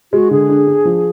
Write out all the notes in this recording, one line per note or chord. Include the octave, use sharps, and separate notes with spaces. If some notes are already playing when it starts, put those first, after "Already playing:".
G#3 F#4
D3 G#4
D4
D4
F3